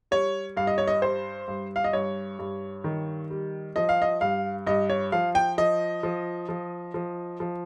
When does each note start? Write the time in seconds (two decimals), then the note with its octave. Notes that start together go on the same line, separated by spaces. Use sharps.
0.11 G3 C#5
0.57 G2 F5
0.67 D#5
0.78 C#5
0.88 D#5
1.02 G3 C5
1.48 G2
1.76 F5
1.84 D#5
1.93 G2 C#5
2.39 G2
2.84 D#3
3.30 G3
3.76 F3 D#5
3.89 F5
4.02 D#5
4.21 G2 F5
4.67 G2 D#5
4.89 C#5
5.12 F3 F5
5.35 G5
5.58 F3 D#5
6.03 F3
6.49 F3
6.94 F3
7.40 F3